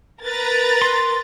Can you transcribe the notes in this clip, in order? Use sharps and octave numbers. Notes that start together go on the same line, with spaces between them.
A#4 B4 A#5 A6
C6